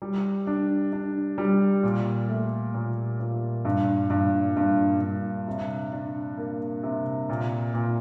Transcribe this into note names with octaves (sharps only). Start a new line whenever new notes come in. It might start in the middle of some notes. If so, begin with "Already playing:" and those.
G3
D4
D4
G3
A#2
A3
A#2
A#2
G2
G2
G2
G2
C3
D4
A#3
C3
A#2
A#2